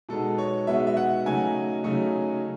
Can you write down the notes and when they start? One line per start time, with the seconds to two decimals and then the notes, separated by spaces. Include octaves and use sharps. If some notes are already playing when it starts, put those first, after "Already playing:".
0.09 B2 G#3 B3 D#4 A4
0.38 C#5
0.67 B2 G#3 B3 D#4 E5
0.87 E5
0.97 F#5
1.26 C#3 F#3 A3 D#4 G#5
1.84 C#3 F#3 A3 D#4